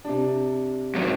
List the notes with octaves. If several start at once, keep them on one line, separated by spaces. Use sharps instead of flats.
C3 D4
G#2 F#3